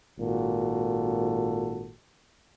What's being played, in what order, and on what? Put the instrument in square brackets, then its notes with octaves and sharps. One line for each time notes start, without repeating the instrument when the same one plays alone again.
[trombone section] G#1 A#2 F#4 A4